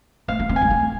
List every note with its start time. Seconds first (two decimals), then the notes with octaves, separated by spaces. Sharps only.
0.28 A3 F5
0.39 B3
0.49 C4
0.56 G#5
0.61 G#3
0.70 A3